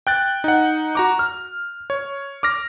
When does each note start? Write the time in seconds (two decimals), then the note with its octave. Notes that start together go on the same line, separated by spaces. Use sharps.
0.07 G5 F#6 A6
0.44 D#4 F#5
0.95 F#4 A#5 D6
1.19 F6
1.90 C#5
2.43 D6 F6 A#6